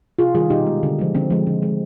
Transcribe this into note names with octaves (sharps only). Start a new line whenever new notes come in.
C3 F4 G#4
D#3 G3 F4 G#4
B2 D#4 G4
G#3
D3
F3 G#3
D3 C4
F3 G#3
D3
G#3